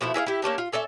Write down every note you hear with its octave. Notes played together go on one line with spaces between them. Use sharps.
B2 F3 A3 E4
E4 G#4 C#5 F5
E4 G4
A#3 C#4 D4 G4
F4
C#4 A4 D5 E5